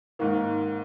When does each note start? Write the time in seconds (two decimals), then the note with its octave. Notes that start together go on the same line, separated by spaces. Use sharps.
0.19 G#2 D#3 A#3